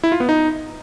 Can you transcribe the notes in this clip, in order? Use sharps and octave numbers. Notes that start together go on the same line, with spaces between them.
E4
F4
B3
D#4